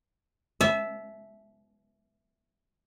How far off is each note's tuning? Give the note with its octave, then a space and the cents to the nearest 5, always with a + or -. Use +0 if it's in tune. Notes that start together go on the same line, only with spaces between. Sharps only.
E5 +0 A5 -40